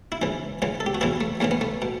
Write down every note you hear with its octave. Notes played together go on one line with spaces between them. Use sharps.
E4
C#2 C#3 E3
C#2 C#3 E3
A4
G4
F#4
E2 C#3 E3 E4
A3
E2 C#3 E3 A3
B3
A3
B2